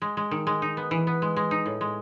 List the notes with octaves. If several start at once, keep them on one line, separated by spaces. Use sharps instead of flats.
G#3
G#3
D#3
G#3
D#4
B3
E3
B3
G#3
G#3
D#4
A2
G#3